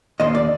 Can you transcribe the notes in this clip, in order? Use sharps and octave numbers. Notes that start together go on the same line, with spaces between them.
D#2 C5 D#5
D5